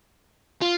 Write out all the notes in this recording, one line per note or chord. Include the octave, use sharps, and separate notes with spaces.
F4